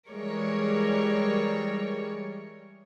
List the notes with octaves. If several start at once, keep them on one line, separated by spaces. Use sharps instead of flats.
E3 G3 G#3 A#4 C#5